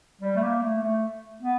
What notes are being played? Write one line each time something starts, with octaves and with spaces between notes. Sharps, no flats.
G3
A3
A#3
A3
A3
B3